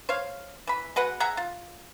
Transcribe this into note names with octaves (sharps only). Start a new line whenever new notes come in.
C5 C#5 F5
E3 B5
G#3 F#4 B4 F#5
G#4 E5 F#5 A#5
F4